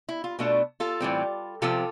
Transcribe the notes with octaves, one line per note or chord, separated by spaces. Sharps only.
E4
F4
B2 A3 D4 F4
F4 A4
A2 E3 G3 C4
C3 F3 C4 F4 A4